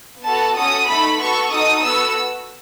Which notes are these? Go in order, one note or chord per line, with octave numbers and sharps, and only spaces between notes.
B3 F#4 A4 A5
C#4 F#4 A4 D#6
A3 D#4 A4 B5
B3 F#4 A4 C#6
D#4 F#4 A4 D#6
B3 F#4 A4 E6